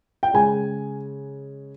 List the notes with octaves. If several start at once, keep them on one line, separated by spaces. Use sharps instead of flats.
G5
C#3 G#3 G#5